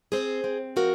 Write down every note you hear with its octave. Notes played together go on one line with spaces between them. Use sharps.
C4 G#4 C5
C4
F3 F#4 A#4